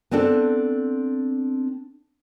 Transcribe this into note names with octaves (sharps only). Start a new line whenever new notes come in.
B3 C4 D4 A4